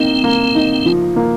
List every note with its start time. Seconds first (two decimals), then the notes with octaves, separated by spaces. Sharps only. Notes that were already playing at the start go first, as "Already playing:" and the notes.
Already playing: A#3 C4 D#4
0.24 A#3
0.55 D#4
0.86 F3
1.16 A#3